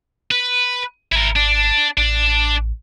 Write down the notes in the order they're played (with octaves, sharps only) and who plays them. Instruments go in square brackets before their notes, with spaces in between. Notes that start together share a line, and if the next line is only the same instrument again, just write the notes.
[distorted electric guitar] B4
[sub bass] G#1 [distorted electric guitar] E4 A#4
[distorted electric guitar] D4
[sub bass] A1 [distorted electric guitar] D4